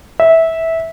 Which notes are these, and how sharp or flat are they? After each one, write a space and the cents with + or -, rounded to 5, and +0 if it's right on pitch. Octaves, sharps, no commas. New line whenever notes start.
E5 -15